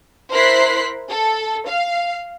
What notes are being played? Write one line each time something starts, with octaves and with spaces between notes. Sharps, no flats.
E4 A#4 C5 F#6 B6 C7
A4
F5